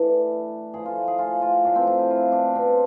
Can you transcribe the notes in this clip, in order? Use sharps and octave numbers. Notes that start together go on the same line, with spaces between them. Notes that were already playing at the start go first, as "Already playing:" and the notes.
Already playing: A2 E3 D4 E4
A2 F3 G#4
F4
G#4
F4
F4
A2 F3 D4
C4
D4
E4
F4
D4
B2 C4